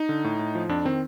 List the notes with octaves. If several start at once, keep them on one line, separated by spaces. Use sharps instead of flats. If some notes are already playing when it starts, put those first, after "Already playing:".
Already playing: D#4
D3
A2
A2
F3
F2 D4
D#3 C4